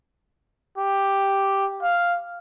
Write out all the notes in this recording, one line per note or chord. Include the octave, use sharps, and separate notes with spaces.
G4
F5